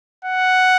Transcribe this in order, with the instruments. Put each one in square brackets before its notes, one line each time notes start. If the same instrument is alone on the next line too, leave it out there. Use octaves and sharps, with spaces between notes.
[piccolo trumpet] F#5